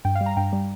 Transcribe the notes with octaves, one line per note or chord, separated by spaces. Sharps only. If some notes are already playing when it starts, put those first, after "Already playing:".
G2 G5
F5
G3
A#5
G2 G5
G3